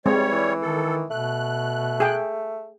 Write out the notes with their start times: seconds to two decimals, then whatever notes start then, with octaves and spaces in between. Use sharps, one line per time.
0.06 E2 G3 G#3 C4 C#5
0.31 E3
0.62 D#3 A4
1.10 B2 A3 F#6
2.00 G#4 G5